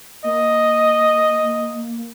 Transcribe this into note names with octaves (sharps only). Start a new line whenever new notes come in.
A#3 D#5